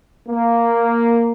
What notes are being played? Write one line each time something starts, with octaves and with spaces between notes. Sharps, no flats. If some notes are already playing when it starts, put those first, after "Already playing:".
A#3